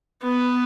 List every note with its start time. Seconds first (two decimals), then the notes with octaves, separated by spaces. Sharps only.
0.23 B3